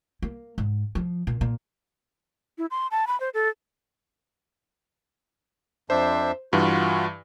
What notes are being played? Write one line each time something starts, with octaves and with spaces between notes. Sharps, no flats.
A#3
G#2
F3
A#2
A#2
E4
C6
A5
B5
C5
A4
F2 D4 C5 E5
G2 E3 F4 F#4